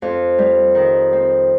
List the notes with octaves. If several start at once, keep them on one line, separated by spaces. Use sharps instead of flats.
F2
G3
D#3
C4